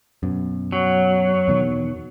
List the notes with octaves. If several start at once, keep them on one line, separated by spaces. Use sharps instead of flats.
F#2 B2
F#3
E2 B2 D#3